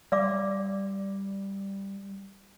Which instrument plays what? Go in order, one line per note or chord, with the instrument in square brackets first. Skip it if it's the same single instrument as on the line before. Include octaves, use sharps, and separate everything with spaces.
[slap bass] G3 [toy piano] D5 F5 D6